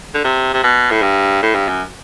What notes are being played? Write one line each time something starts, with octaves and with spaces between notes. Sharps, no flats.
D3
C3
C3
B2
A2
G2
A2
G2
F#2